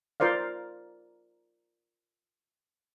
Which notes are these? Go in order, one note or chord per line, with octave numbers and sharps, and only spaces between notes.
F4 A#4 C5 D5 F5